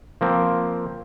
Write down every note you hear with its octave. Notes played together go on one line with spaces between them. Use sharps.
F3 A#3 C4